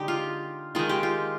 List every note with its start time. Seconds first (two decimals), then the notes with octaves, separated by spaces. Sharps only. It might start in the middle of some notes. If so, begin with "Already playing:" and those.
Already playing: D3 G#3 D#4 G4
0.08 F4
0.75 D#3 G#3 D#4 F4
0.89 G4
1.03 F4